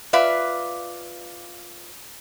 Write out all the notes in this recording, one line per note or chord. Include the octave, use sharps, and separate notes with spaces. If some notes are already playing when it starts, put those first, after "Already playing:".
F4 B4 D5 E5 F5